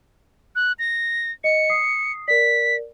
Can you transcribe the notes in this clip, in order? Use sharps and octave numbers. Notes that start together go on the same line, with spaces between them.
F#6
A#6
D#5 C#7
D#6 C7
A#4 D5 B6